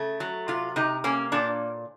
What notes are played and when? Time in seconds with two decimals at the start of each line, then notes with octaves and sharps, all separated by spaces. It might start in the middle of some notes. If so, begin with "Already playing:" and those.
Already playing: C#3 A3
0.20 F#3
0.48 C3 F4
0.76 C3 D#4
1.04 A#3 C#4
1.32 A#2 D4